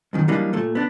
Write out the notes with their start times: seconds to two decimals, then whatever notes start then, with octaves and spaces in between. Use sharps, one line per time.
0.13 B1 F#2 D#3
0.28 E3 F#3 G3 A#3 D4 D#4
0.53 A#2 A3
0.75 B3 D4